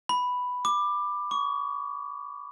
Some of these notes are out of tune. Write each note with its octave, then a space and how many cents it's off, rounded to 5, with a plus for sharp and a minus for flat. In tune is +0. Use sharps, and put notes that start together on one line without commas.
B5 +5
D6 +15
C#6 +35